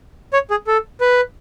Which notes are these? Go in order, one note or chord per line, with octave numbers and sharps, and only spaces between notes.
C#5
G#4
A4
B4